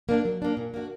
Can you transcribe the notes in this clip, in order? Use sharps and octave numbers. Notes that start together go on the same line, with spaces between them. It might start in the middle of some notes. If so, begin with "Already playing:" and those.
A#3 D4
F#3
A#3 D4
A#2
A#3 D4 F#4